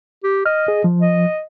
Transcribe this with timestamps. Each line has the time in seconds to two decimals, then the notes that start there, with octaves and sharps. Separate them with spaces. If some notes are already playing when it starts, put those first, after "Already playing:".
0.24 G4
0.46 D#5 F6
0.68 G#4
0.84 F3
1.01 D#5